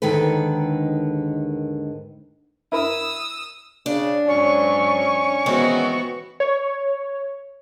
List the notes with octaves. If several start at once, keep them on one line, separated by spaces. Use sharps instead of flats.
D#2 G#2 D3 D#3 A4 B4
E4 A#4 B5 D#6 E6
C#3 D4
G#2 F#3 C#4 C#6
D#3 E3 G#3 B3 C4 F#4
C#5